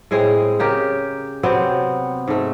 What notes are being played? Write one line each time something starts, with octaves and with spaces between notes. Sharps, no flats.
A2 G#3 C4 G#4
C#3 G4 A#4
C3 F#3 B3 C4
G#2 A3